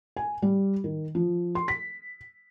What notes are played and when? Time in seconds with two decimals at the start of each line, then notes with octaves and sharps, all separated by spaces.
0.17 G#5
0.42 G3
0.84 D#3
1.15 F3
1.55 C6
1.68 B6